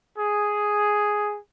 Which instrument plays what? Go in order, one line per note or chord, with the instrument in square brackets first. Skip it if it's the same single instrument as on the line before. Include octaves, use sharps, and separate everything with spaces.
[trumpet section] G#4